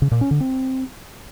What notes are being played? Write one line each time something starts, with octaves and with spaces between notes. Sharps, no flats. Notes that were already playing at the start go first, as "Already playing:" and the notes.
C#3
A#2
C#4
D3
C4